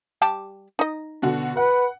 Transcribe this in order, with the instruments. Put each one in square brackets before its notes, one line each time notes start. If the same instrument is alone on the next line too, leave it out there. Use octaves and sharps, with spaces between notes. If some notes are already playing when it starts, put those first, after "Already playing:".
[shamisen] G3 G4 A5
D#4 D#5
[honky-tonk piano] B2 D3 F#4
[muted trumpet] B4 [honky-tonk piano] F#5